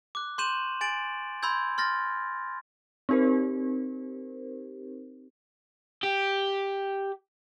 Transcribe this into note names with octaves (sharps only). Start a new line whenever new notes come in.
D6 F#6
C6 C#6 G6 D#7 E7 F#7
G#5 A6 D7 F#7
B5 C6 E6 G6 G#6
C6 F6 A6 A#6
C4 D#4 G4 A#4 C5
G4